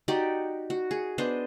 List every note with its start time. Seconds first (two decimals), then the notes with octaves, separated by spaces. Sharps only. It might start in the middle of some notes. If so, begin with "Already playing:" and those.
0.08 D#4 F#4 G4 D5
0.70 F#4
0.91 G#4
1.18 B3 D4 C5 D#5